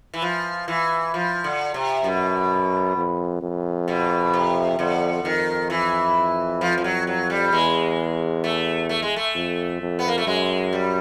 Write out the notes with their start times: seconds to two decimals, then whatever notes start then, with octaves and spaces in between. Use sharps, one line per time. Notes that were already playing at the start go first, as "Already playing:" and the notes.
0.14 E3
0.22 F3
0.68 E3
1.14 F3
1.44 D3
1.74 C3
2.04 F#2 B2
2.97 F2
3.42 F2
3.88 B2
4.34 C3
4.79 F2 D3
5.24 F2 D#3
5.70 E3
6.61 F3
6.78 F3
6.84 F#3
7.07 F#3
7.30 G3
7.52 E2 G#3
8.44 A3
8.89 A3
9.02 G#3
9.16 A3
9.35 F2
9.81 F2
9.99 B3
10.08 A#3
10.18 A3
10.27 F#2 G#3
10.73 G3